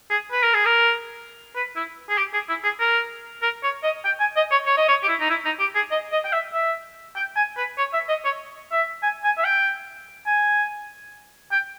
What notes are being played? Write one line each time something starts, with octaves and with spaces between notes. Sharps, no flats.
G#4
B4
A#4
G#4
A#4
B4
E4
G#4
G4
G#4
E4
G#4
A#4
A#4
C#5
D#5
G5
G#5
D#5
C#5
C#5
D#5
C#5
G4
E4
D#4
E4
D#4
G4
G#4
D#5
D#5
G5
E5
E5
G5
G#5
B4
C#5
E5
D#5
C#5
E5
G#5
G#5
E5
G5
G#5
G5